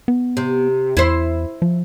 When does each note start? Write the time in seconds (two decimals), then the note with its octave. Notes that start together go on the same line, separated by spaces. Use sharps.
0.08 B3
0.37 C3
0.97 E2 E4 C5
1.62 F3